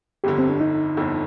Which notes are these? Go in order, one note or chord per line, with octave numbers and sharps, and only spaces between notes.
G1 F2 D3 G4
C4
D4
D#4
G1 F2 D3